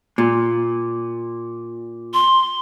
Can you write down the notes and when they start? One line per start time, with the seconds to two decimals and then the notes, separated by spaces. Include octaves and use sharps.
0.18 A#2
2.14 C6